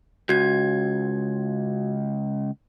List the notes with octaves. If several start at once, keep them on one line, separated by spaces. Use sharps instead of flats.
C#2 F#4 G#6